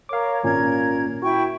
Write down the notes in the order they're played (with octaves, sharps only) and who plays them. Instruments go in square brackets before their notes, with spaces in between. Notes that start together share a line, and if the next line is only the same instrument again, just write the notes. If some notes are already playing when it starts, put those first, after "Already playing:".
[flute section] A#4 C#5 [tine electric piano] F5 D6
[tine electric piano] G#1 A#2 C#4 [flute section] A#4 G#6
[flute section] E4 G5 C#6 [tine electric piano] F#4